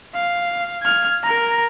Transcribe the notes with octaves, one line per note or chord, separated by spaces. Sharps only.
F5
F6 G#6
A#4 A#5